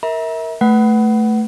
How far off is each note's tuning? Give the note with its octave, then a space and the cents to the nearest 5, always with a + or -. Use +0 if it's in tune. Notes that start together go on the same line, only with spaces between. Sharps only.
A#4 +0 E5 -30 A#5 +40
A3 +0 B4 +0 F#5 +20